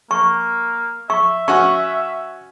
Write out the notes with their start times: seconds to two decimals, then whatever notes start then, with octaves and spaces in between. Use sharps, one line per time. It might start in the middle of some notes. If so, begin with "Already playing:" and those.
0.11 A#3 C#6
1.10 E5 C#6
1.48 C#4 F#4 C#6